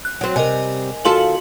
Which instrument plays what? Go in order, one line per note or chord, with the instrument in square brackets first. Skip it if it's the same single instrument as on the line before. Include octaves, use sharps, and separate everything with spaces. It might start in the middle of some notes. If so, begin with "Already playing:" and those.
[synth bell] F#6
[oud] F#3 C4
[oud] C3 G3 [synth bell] A#4 D#5 G#5
[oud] D#2 F4 A4 [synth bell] F#4 C6 F#7